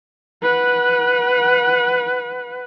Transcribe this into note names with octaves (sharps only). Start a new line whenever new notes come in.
B4 F#5